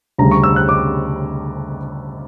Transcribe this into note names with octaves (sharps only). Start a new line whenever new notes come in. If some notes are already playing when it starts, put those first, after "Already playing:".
D2 C#3 G3 A#5
C#6
E6
F#6
D6